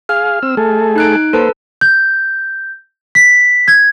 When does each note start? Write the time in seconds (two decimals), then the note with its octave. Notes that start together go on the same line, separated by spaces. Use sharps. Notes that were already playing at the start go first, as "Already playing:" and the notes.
0.09 G#4 F5 F6
0.43 C4 E6
0.57 A3 G#4 A4
0.96 D#4 F#6 D7
1.33 A#3 A4 B4 C5 A5
1.81 G6
3.15 B6
3.68 G#6